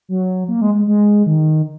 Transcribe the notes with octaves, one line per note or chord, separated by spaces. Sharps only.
F#3
A#3
G#3
G#3
G#3
D#3